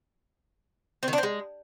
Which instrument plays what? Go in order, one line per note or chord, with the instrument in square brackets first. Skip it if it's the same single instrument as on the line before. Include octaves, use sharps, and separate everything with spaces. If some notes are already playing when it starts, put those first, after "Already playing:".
[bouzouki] C4
D#3
D4
C4
G#3